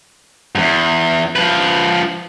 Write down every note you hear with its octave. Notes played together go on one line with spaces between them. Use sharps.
E2 G#2
F3 B4